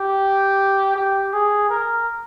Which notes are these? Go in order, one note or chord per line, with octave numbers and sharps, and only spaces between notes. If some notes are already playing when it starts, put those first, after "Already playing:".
Already playing: G4
G4
G#4
A#4